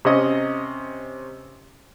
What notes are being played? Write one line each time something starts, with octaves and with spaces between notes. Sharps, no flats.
C3 C#4 D#5